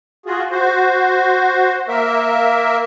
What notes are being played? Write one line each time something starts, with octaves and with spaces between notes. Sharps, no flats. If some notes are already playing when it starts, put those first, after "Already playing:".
F4 F#4 G#4
F#4 C5
A#3 A#4 E5